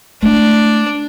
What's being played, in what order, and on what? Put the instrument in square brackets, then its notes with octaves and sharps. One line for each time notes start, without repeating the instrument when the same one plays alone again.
[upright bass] A3 E4 [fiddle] D4